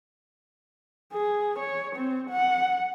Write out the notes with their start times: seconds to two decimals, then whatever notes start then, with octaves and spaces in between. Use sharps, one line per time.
1.13 G#4
1.60 C#5
1.96 C4
2.30 F#5